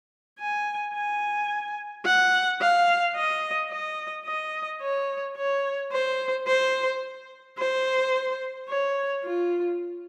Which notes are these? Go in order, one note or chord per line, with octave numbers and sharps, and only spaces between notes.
G#5
G#5
F#5
F5
D#5
D#5
D#5
C#5
C#5
C5
C5
C5
C#5
F4